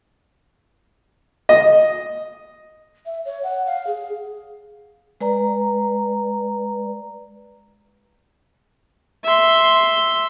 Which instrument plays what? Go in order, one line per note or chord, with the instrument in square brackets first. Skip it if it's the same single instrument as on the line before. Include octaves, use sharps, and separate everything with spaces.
[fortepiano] D#5
[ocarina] E5
C#5
F#5
F5
G#4
[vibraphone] G#3 B4 D5 A#5
[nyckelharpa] E5 C6